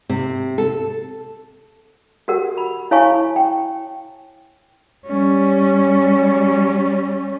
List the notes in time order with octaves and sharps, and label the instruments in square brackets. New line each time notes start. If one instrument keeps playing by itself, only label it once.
[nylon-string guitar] C3
A4
[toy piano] F#4 G4 A#4 F#5
B5
E4 C#5 F5 G#5 A5 C#6
G5
[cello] G3 C#4